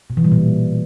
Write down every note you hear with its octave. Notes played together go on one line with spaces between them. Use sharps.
B2
E3
G3
A#2